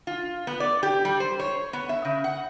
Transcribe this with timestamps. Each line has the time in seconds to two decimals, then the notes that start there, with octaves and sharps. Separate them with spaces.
0.07 F4
0.47 B3
0.60 D5
0.83 G4
1.05 G3
1.20 C5
1.40 C#5
1.73 B3
1.89 E5
2.05 C#3
2.24 F#5